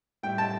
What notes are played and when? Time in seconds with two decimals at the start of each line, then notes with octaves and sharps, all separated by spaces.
0.23 A2 G3 E4 G4 E5 G5
0.38 A5